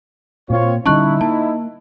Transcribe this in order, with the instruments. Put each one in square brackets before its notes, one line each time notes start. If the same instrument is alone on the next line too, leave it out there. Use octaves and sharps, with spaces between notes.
[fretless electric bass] A#2 A#3 [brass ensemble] C4 F4 C#5
[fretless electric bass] D3 G3 C#4 [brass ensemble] D#4 E4 [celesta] A5 C#6 F#6
[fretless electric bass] A#3 [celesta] A5